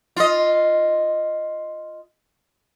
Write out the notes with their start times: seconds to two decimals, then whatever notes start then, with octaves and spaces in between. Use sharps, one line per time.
0.16 F4 D#5